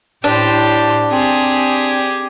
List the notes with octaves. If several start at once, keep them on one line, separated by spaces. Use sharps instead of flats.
A2 D4 G4 C5
C4 G4 G#4